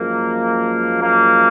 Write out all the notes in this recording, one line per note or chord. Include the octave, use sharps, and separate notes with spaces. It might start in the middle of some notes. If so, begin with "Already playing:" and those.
Already playing: F#2 F3 G#3 A#3
A#3